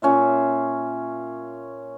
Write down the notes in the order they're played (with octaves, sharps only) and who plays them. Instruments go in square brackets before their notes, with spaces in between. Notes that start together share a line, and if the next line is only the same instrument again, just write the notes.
[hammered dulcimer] A#2 C#4 F4 E5